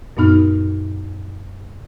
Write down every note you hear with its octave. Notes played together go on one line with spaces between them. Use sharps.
F#2 A#2 B3 D#4 F6